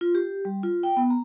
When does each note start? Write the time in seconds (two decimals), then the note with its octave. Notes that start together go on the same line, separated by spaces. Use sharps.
0.01 F4
0.15 G4
0.45 G3
0.63 F4
0.83 G5
0.97 B3
1.10 A#5